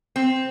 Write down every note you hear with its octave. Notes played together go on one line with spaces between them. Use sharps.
C4